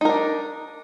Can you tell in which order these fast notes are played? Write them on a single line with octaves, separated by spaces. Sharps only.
D#4 A#4 D4